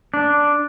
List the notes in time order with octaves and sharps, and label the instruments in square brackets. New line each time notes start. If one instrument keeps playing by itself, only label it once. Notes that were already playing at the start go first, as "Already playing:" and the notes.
[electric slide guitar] D4